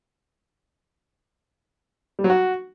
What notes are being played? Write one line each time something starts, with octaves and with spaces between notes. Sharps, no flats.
G3
F#3
F#4